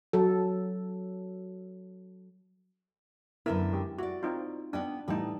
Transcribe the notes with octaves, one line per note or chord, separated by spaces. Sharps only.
F#3 A4
F#2 D3 B3 E4 A#4 E5
G#3 G4
E4 F#4 D5
C4 D#4 F4
B3 D4 D#5 G5
A2 E3 G3 D#4 A5